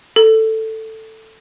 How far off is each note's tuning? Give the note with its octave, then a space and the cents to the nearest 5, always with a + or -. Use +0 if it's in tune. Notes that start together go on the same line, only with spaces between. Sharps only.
A4 +5